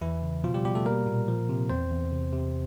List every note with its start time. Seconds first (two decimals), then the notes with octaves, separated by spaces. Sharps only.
0.01 E2 E3 E4
0.22 C#3
0.44 B2 F3 F4
0.54 G3 G4
0.65 B2 G3 G4
0.75 A3 A4
0.85 G3 A#3 A#4
1.06 A#2
1.28 F3
1.49 C3
1.70 E2 C4 C5
1.91 E2
2.12 C3
2.33 C3